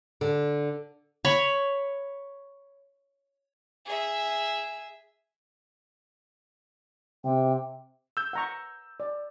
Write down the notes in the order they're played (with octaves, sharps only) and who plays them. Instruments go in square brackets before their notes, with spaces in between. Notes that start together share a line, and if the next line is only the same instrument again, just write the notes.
[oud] D3
[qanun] C#5 B5
[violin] G#4 E5
[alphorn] C3 [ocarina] G5
[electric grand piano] E6 G6
[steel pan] F#5 A#5 C#6
D5